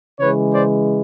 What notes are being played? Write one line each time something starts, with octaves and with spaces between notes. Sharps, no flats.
C#3 E3 G#3 B4 C#5
C5 D5